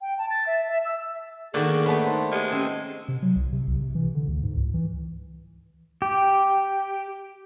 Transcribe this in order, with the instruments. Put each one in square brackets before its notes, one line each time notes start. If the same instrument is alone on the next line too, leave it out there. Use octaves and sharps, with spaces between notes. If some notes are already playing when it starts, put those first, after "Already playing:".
[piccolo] G5
A5
A6
E5
E5
E6
[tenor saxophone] D3 [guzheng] D#3 F#4 D5 [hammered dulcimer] A#3 [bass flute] G#4
[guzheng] A3 B3 [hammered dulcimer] C#5 A5
[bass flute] D#4 [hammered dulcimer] C5
[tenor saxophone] G#3 [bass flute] G4
[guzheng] C4 [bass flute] C#4
[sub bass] C3
F#3
C2
C3
C2
C3
E3
D3
D2
G#2
C#2
E3
[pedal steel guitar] G4